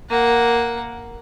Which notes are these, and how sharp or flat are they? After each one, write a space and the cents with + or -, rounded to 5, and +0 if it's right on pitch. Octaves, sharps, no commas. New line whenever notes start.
A#3 +0 F#5 +0